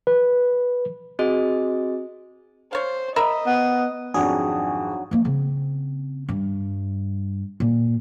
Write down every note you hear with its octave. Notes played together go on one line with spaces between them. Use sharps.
B4
C4 F#4 G#4 D#5
C5 C#5 F5
A#4 D#5 E5 B5
B3
G#1 F2 F#3 D4 G#4 F#5
F3 A#3
C#3 C4
G2 G3
A#2 D#3